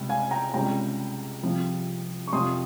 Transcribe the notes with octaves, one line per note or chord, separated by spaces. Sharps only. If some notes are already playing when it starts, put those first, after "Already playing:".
Already playing: C#2 C3 G3
F5 G#5
G5 A#5
C#2 C3 G3 C#4 G5 A#5
C2 C3 F3
C#6
F2 C3 F3 C6 D#6